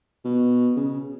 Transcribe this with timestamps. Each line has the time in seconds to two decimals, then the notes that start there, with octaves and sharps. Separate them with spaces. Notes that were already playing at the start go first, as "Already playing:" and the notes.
0.24 B2
0.76 C#3